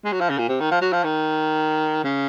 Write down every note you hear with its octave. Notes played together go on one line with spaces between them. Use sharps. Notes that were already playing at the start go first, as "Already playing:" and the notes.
G#3
F#3
F3
C#3
A#2
C3
D#3
F3
F#3
F3
D#3
C#3